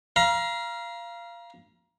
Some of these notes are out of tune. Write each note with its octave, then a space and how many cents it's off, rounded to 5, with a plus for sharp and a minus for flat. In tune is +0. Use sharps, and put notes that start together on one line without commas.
F5 -15 A#5 +30